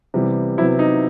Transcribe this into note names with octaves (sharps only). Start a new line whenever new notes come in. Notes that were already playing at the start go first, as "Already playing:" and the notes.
C3 E3 G3 B3
C3 F#3 B3 E4
D#4